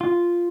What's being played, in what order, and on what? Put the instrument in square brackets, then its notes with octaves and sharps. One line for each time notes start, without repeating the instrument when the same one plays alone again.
[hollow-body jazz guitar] F4